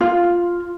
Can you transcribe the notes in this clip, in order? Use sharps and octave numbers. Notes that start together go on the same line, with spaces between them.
F4